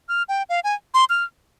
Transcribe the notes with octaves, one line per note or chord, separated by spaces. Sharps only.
F6
G5
F5
G#5
C6
F6